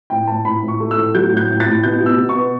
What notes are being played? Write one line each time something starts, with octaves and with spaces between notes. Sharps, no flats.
A2 G5
A2 A5
A2 B5
A2
C#6
A3
E6
A2
F#3 G6
A2 G6
A2
A6
A2
B2 G6
B2
E6
B2
C#6
B3